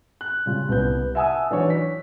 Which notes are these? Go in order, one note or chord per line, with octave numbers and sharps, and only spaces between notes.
F#6
C#3 G3 F4
C2 B3 B4 G6
E5 F#5 G#5 A5 D#6 E6
E3 F#3 D4 D#4 F#4 C#5
B6